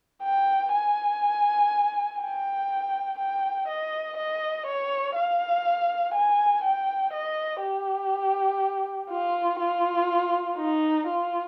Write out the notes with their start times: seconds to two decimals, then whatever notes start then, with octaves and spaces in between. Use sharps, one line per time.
0.23 G5
0.73 G#5
2.20 G5
3.18 G5
3.68 D#5
4.18 D#5
4.66 C#5
5.16 F5
6.14 G#5
6.64 G5
7.13 D#5
7.62 G4
9.10 F4
9.60 F4
10.57 D#4
11.07 F4